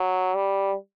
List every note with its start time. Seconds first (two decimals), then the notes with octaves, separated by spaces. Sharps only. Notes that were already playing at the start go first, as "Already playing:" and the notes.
Already playing: F#3
0.35 G3